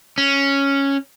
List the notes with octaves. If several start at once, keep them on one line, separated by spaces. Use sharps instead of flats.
C#4